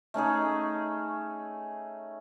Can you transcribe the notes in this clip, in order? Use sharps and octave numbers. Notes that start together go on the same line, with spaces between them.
A3 C#4 D#4 G#4